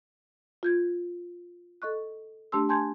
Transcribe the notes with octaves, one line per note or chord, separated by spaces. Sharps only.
F4 G6 G#6
A4 D#5 C#6 F#6
A3 D4 G4 A5 C6 E6
G#5 A5 C6 G6 G#6